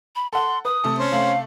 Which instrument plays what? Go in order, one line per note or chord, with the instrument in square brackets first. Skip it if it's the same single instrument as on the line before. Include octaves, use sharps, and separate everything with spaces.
[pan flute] B5
[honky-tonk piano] A4 F#5 [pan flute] C6
[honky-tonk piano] B4 [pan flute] D#6
[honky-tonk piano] C3 A3 A4
[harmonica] C#4 C5
[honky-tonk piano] C3 A3 F#7 [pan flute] F5